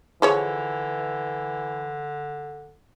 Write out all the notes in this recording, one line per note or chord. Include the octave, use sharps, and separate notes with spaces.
D3 E3 F3 G#4 C#5